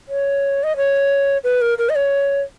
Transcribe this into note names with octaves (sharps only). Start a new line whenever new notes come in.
C#5
D#5
C#5
B4
A#4
A#4
D#5
C#5